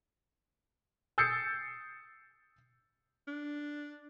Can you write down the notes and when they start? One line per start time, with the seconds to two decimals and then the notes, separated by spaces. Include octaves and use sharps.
1.18 D#6 E6 G6 A6 C7 C#7
3.28 D4